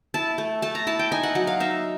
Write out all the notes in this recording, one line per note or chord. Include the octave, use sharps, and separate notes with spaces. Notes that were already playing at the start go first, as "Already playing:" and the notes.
E4 A5
A3
A3 A5
A#5
E4 A5
G5
D#4 G#5
F#5
F#3 F#5
F5
D#4 E5